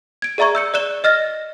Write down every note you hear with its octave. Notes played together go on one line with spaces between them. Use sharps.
G#6 D7
G#4 D5 E5 A#5 C#6 G#6
E6 G6 C#7
D5 F#6 E7 G7
D#5 F6 A6 A#6